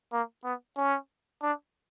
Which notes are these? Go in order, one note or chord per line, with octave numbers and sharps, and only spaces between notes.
A#3
B3
C#4
D4